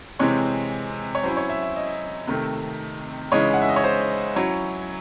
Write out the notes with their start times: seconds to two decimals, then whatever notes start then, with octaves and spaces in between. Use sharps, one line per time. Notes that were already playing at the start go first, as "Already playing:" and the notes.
0.19 C3 E3 G#3 C4 C#5
1.15 C#5
1.23 F#3 C#4 E4 C5
1.37 C#5
1.49 E5
1.63 E5
1.76 D#5
2.27 C3 D#3 A3
3.32 C#3 E3 G#3 D#4 C#5
3.54 F#5
3.61 E5
3.69 D#5
3.76 C#5
3.84 C5
4.36 F#3 C#4 E4 C#5